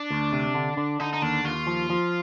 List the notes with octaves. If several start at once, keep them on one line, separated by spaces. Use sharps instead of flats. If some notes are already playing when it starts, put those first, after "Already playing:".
Already playing: D4
D2
C3
D3
D3
D3 D#4
D#4
D#2 D4
D#2 F4
F3
F3